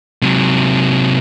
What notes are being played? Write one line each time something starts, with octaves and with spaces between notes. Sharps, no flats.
C3 F#3